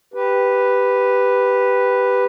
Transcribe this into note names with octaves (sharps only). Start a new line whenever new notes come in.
G4 B4